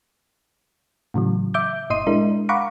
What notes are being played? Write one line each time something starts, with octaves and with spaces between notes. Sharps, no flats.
A2 C#3 E3 F#3
E5 D6 G6
G1 A#2 D#5 C6 D#7
G#3 D4 E4 A#4
F5 F#5 A#5 B5 C#6 D6